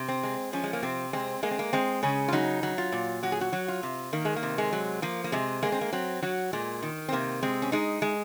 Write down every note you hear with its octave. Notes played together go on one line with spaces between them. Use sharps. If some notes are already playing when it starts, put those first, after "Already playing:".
Already playing: C3
C4
G#3
F3 C#4
G#3
A#3
C3 C4
G#3 C4
G#3 A#3
C4
A#3
G#3 C4
C#3 C#4
F4
F#3 D#4
F#3
F4
A#2
F#3 F#4
G#4
F#4
F#3
F4
C3
D#3 A#3
G#3
A#3
C3
G#3
F#3
F3 A#3
A#3
C3 G#3
G#3 A#3
C4
A#3
F#3 C4
F#3 F#4
A#2 G#3
D#3
C4
C3 A#3
G#3 C4
C#4
G#3 D#4
G#3